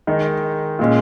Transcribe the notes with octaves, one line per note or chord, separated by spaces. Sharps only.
D#3 G#3 D#4
A#2 G#3 C#4